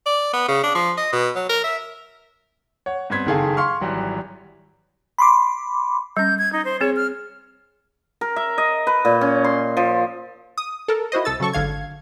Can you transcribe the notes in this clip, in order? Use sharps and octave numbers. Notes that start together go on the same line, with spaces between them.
D5
B3
C#3
D4
F3
D#5
B2
F#3
A#4
E5
C#5 F#5
G2 B3 C4 G#6 B6
F#1 D#3 G#4 A4 F5
F5 C6 C#6 F6
G#1 E3 F#3 G3
B5 C6 D6
G3 C#4 G6
G#6
D#4
C5
C4 G#4 C#5
F6
A#4
E5
D#5
B4
A#2
C#4
C6
F3
D#6
A4 A#4
E4 F#4 C5 D#5
C2 A4 E6 A6
C#3 F#3 A4 C#6
G#1 D3 F5 G#6